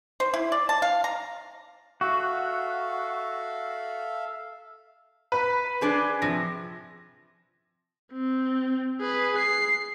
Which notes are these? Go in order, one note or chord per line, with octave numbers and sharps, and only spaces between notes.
C5
E4
D5
A5
F5
A#5
F#4 A4 E5 F5
B4
D4 G#4 C5
C3 F3 A#6
C4
G#4 B4
C7